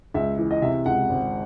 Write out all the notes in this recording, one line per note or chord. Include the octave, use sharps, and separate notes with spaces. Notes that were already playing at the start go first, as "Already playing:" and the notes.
C#2 E5
E3
D#5
C3 E5
C#2 F#5
G#1